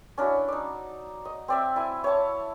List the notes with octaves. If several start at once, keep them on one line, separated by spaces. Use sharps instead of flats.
C#4 D4 E4 F#4
D#4 D5
D#5
C4 D5 E5
E4 G#5
C#5 A5